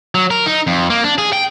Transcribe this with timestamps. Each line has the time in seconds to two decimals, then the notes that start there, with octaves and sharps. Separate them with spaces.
0.15 F#3
0.31 A#4
0.46 D#4
0.67 F2
0.90 A#3
1.04 D4
1.18 G#4
1.33 G5